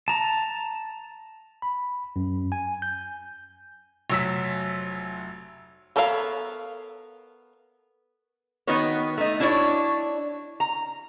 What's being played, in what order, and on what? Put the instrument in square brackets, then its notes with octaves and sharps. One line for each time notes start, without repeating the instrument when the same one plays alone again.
[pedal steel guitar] A5 A#5
[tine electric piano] B5
F#2
G#5
G6
[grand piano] F1 F#3 E6 B6
[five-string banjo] B3 A4 A#4 C#5 F5
[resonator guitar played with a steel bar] D#3 B3 D#4 F#4 B4 C#5
A3 D#4
D4 E4 F#4 C#5 D5
A#5